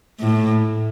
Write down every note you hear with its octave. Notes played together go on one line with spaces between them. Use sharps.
A2